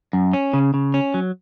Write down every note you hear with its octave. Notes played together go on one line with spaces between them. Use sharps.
F#2
C#4
C#3
C#3
C#4
F#3